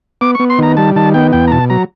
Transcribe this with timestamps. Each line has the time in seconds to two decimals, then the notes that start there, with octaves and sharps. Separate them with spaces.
0.21 B3 D6
0.35 B3 C#6
0.50 C6
0.58 D#3 A#5
0.77 G3 A5
0.96 D#3 A5
1.14 B3 G5
1.32 E2 G5
1.47 A#5
1.52 B2 A5
1.70 F#3 A#5